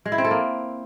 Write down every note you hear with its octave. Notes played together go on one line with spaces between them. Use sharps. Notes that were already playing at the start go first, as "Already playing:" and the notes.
G#3
E4
C4
A4
A#3